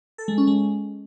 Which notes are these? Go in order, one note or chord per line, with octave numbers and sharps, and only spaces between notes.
A4
G#3
C#4
G#3